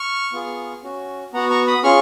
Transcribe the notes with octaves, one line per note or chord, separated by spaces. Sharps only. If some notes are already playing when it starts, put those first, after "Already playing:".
Already playing: C#6 F6
B3 F4 G#4
C#4 F#4
B3 F#4 F#5 A#5
A#5 C#6
B5 D#6
C#4 F4 G#4 C#6 F6